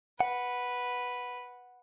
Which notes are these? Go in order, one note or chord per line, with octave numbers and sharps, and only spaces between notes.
B4 F#5